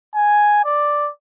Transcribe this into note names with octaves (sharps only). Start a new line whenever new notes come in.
G#5
D5